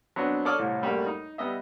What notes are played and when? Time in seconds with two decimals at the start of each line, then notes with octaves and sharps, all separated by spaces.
0.16 F#3 B3 C4 D4
0.45 A4 C#5 D5 D6 D#6 F6
0.59 C2 A2
0.82 F#2 G3 A3 A#3
1.06 D#4
1.38 G3 B3 D#5 E5